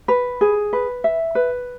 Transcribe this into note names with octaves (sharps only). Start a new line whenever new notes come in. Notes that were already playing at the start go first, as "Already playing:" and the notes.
B4
G#4
B4
E5
B4